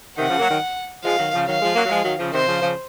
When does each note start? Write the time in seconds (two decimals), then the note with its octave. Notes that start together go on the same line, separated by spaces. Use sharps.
0.18 C3 D#3 F#5
0.29 C#3 F3
0.39 F#3 A#3
0.50 D#3 F#3
1.04 F3 G#3 F5
1.19 D#3 F#3
1.33 C#3 F3
1.47 D#3 F#3 F5
1.61 F3 G#3
1.75 F#3 A#3
1.85 F#3
1.90 F3 G#3
2.05 D#3 F#3
2.19 C#3 F3
2.33 C3 D#3 C5
2.48 C#3 F3
2.62 C#3 F3